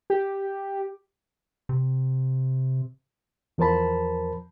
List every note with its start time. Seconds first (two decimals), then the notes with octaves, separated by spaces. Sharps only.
0.10 G4
1.69 C3
3.58 E2 F3 A#4 C5 A5 B5